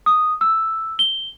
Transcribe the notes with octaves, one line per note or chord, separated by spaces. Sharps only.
D#6
E6
G7